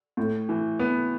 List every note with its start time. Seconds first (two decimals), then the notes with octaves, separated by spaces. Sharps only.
0.17 A2
0.49 E3
0.79 B3